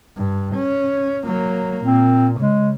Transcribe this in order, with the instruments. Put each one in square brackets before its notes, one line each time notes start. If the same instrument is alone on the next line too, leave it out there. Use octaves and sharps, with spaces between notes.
[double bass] G2
C#4
F#3 A#3
[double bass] A#2 [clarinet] C4
[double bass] C#3 [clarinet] G#3